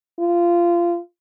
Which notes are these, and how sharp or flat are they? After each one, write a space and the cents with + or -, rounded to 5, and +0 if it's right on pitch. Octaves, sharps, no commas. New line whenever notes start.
F4 -20